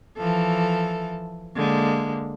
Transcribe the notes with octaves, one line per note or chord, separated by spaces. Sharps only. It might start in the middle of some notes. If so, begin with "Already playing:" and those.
E3 F3 A4
D3 G#3 A#3